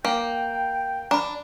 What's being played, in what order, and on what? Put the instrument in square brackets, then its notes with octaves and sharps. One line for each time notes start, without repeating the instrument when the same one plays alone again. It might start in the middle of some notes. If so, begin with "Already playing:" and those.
[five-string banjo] A#3 [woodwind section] G5
[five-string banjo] D4 [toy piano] A#5 B5